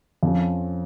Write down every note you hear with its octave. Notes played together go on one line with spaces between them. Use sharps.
F2 F3 C#4